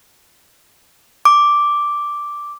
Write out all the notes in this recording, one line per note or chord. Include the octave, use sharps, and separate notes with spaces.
D6